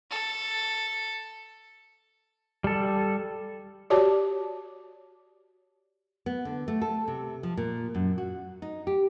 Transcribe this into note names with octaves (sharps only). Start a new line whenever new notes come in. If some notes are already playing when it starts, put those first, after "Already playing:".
A4
G3 A4
F#4 G4 C#5 D5 A5 D6
B3
D3
A3
A4
C3
F3
A#2
F#2
F#4
D#4
G4